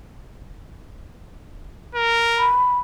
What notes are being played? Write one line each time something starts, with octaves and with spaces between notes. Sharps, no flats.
A#4
B5